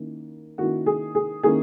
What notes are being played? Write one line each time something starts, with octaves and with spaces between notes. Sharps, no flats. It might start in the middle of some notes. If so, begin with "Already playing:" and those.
Already playing: D#3 A#3 C#4 E4
D#3 A#3 C#4 E4 F#4
G#4
G#4
D#3 A#3 C#4 E4 G#4